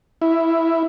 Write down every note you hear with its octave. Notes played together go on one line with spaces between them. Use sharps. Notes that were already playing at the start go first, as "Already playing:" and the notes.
E4